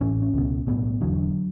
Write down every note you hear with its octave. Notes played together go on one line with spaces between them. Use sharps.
A1 A2 C#4
C#4
C#2 B2
B1 A2 B3
E1 E2 D3 F#3